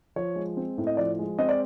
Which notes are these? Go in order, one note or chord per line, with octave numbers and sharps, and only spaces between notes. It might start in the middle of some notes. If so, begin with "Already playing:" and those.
F3 C#5
G#3
C4
A2
D#5
F3 D5
G#3
C4 D#5
D5